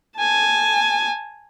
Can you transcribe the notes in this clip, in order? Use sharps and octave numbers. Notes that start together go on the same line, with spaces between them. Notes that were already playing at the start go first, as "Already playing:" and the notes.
G#5 A5